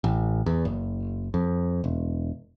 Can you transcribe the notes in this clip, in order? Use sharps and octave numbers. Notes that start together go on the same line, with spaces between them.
A1
E2
F#1
F2
E1